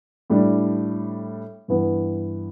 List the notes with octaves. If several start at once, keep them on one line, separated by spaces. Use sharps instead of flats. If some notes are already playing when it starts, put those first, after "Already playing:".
A2 G3 D4
G2 E3 B3